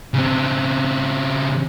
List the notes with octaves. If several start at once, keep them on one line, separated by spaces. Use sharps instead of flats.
C#3 C4